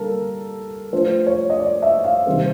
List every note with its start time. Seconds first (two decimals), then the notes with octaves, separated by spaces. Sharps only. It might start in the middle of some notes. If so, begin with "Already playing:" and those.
Already playing: D3 G3 A#3 A4 A#4
0.93 F3 A3 D4 F4 C5
1.26 C#5
1.50 D#5
1.60 D5
1.82 E5
2.04 F5
2.27 C3 D#3 G3 C4